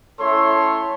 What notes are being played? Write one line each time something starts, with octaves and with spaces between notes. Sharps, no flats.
A3 C#4 E4 A4 C#5 C6